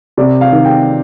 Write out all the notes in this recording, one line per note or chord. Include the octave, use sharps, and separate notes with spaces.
C3 D5
F5
D#3
G5